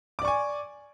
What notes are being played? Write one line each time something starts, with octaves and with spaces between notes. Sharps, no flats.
D5 G#5 C#6 D6